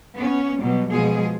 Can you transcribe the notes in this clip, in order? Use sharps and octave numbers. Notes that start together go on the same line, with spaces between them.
B3 C#4
B2 F#3 G3
B2 F3 G#3 G#4